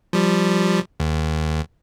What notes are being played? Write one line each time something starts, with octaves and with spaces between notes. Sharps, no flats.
F3 G3
D#2